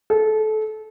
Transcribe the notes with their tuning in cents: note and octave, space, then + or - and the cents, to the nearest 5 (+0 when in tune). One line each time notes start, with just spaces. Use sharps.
A4 -25